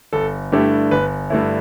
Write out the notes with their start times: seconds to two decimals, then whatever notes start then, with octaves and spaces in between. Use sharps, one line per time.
0.13 G1 A4
0.52 G2 D3 A3 E4 G4
0.91 G1 B4
1.30 G2 D3 A3 E4